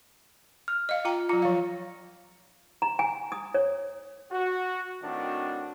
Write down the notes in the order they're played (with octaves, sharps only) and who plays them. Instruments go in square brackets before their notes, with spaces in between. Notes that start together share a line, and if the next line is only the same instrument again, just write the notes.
[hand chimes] F6
[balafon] D#5 F5
F4 G5 A#5
[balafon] F#3 F4 [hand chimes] A#5
[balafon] F3 F5
[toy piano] A#5
G#5
D#6
C#5
[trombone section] F#4
A2 D#3 C4 D4 F#4